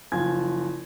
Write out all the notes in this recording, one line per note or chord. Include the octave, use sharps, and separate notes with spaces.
F#1 F3 F4 G#5 G#6